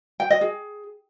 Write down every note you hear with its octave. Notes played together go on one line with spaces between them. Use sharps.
G5
D#5
G#4